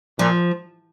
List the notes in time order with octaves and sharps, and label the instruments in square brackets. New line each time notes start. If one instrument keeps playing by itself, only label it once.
[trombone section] A#2 [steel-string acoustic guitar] F3